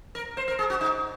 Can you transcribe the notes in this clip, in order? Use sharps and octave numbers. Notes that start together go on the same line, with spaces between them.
A#4
C5
A#4
G#4
F#4
D#4